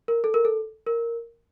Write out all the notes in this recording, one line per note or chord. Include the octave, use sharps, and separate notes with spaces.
A#4
A4
A#4
A4
A#4